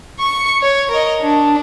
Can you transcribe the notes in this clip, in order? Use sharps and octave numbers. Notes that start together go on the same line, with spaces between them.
C#6 C#7
C#5
A#4 D#5
D4